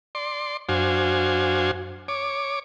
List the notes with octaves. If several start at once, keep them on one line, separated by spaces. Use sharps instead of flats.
D5 C6
F#2 D4 F#4 C5 F5 G#5
C#5 D6